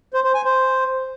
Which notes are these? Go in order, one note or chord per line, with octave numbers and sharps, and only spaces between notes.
C5
C5
G#5
C5